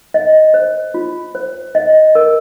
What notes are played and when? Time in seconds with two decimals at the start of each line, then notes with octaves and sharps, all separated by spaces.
0.14 D#5
0.54 C5
0.94 F4
1.35 C5
1.75 D#5
2.15 A#4